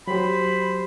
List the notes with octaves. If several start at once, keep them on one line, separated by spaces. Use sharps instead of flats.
F#3 G4 C5 B5